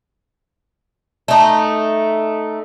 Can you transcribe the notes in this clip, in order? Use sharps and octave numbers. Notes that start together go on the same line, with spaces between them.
A3 D#4